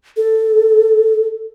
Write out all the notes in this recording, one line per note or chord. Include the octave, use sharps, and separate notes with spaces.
A4